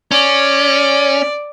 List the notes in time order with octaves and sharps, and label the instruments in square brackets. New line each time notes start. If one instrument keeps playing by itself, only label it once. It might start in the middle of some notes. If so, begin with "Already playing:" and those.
[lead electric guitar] C#4 [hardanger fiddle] D5